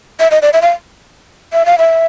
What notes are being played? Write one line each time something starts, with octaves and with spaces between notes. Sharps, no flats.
E5
D#5
D5
E5
F5
E5
F5
E5